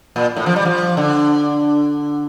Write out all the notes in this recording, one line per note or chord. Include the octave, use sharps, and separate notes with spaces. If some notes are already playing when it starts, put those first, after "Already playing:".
A#2
A2
F3
G3
F3
D3